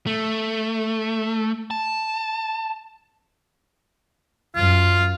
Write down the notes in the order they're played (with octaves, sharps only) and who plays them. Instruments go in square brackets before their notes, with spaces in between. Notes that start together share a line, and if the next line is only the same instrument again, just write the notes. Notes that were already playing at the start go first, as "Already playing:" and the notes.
[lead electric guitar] A3
A5
[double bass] F#2 [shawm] F4